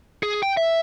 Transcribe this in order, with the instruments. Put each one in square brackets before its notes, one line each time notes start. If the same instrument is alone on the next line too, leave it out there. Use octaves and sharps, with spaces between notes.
[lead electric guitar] G#4
G5
E5